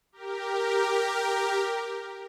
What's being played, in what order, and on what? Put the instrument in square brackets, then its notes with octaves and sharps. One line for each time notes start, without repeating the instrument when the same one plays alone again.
[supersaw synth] G4 A#4